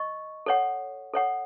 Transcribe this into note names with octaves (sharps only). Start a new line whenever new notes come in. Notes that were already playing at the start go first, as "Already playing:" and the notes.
Already playing: D#5 C#6
A4 C#5 F#5
A4 C#5 F#5